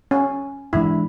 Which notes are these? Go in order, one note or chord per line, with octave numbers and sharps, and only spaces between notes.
C#4
G#2 E3 G#3 D4 E4